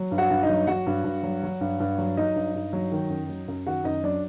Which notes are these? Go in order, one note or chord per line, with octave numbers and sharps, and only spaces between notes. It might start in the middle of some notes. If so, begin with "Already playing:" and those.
Already playing: F#3
G2
F#4 F#5
G2
D#4 D#5
F#3
F#3 F#4 F#5
G2
G2
F#3
F#3
G2
G2
F#3
F#3 D#4 D#5
G2
G2
F#3
D#3
F#2
F#3
F#2
D#3 F#4 F#5
F#2 D#4 D#5
F#3 D4 D5